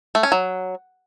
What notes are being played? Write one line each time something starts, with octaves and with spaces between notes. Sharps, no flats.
A3
C#4
F#3